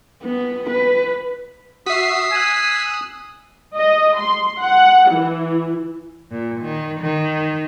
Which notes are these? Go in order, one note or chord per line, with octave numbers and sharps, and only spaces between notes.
B3
B4
F#4 E5 D#6 B6 C7
G#5 E6 F#6
D#5
C6
F#5
E3
A#2
D#3
D#3